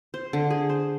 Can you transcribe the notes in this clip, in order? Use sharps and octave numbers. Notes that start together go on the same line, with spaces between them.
C5
D3
G#4
C5